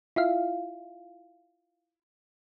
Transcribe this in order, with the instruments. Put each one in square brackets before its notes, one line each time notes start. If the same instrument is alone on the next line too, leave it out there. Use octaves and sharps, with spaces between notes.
[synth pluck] E4 F4 E5 F5